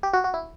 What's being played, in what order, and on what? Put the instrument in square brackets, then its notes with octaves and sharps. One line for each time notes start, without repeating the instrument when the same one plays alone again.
[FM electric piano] G4
F#4
F#4
E4